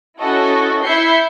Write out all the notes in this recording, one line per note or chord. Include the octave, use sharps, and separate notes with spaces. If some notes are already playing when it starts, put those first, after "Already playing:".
C#4 E4 F#4 A4 D#5
E4 E5 G6 C7 C#7